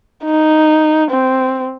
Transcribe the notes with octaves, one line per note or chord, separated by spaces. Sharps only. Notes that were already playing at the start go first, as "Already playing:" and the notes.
D#4
C4